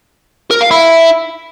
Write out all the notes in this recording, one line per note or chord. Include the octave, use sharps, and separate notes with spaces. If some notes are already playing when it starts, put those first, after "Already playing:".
A#4
F5
E4